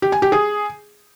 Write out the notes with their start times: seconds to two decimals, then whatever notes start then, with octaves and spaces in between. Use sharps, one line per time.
0.02 G4
0.12 G#5
0.22 G4
0.32 G#4